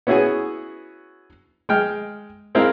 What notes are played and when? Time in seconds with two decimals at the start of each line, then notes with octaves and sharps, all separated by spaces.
0.07 B3 C#4 E4 F#4 G#4 G#5
1.69 G#3 G5 F6
2.55 G#3 C4 E4 A#4 F5